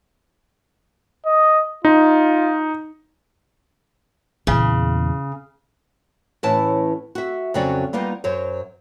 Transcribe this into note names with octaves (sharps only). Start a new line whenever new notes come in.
D#5
D#4 F4
E2 A#2 C#3
A2 E3 C#4 A5
F#4 E5
F2 C#3 F#3 C#4 F#4 D5
G3 A#3 B3 D#4 F4
F#2 F#3 C5 C#5